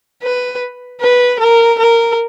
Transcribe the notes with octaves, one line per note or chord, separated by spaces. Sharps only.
B4
B4
A#4
A#4